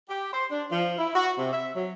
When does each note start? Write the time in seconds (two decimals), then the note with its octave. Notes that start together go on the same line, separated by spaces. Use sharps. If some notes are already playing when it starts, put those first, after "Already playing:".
0.09 G4
0.33 C5
0.52 D4
0.71 F3
0.98 E4
1.15 F#4
1.38 C3
1.53 E5
1.75 F#3